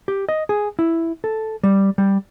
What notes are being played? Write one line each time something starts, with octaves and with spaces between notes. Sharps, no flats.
G4
D#5
G#4
E4
A4
G3
G3